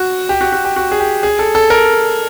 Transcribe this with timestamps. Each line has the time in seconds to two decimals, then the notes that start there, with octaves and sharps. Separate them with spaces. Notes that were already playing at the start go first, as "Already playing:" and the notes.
Already playing: F#4
0.29 G4
0.41 F#4
0.52 F#4
0.65 G4
0.76 F#4
0.92 G#4
1.00 G4
1.23 G#4
1.39 A4
1.55 A4
1.70 A#4